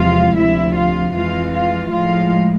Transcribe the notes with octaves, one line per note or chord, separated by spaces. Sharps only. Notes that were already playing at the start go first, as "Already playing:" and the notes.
Already playing: E2 C3 F3 G#3 F4 F5
D2 C3 F3 E4 E5
F4 F5
F2 E3 G#3 F4 F5
F4 F5
A2 F3 G#3 F4 F5